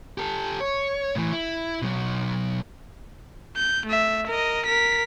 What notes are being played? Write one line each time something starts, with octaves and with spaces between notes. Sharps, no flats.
G4 A4
C#5
A2 E3
E4
B2 F#3
G6
A3 E5
A#4 D#5
A#4 B6